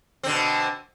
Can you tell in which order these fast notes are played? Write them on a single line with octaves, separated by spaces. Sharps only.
C4 D3 B2